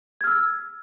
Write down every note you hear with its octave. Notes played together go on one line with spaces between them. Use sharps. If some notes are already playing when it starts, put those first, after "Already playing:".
E6 F6 G#6